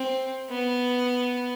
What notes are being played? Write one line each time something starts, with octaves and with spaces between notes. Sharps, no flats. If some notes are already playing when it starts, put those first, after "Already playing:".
Already playing: C4
B3